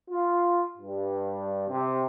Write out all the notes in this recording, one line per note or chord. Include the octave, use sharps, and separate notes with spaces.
F4
G2
C3